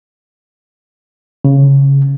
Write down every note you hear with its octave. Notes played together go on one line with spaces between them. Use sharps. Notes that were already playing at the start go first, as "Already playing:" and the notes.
C#3